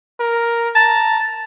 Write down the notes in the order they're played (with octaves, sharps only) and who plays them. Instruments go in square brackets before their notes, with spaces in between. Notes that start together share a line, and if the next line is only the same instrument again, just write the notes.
[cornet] A#4
[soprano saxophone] A5 [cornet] A#5